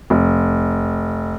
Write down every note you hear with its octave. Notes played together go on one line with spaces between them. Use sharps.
F1